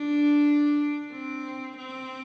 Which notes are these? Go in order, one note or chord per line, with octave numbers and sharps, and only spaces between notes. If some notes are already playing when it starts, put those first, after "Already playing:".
Already playing: D4
C4
C4